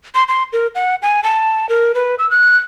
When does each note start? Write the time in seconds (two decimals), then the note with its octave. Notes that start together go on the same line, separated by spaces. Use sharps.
0.15 C6
0.28 C6
0.53 A#4
0.75 F#5
1.02 G#5
1.23 A5
1.69 A#4
1.95 B4
2.19 E6
2.31 F#6